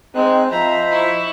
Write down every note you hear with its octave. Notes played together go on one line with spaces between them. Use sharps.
G#3 C4 D#4 D#5 F#6
F3 C5 D#5 E5 A#5 B5
E4 C#6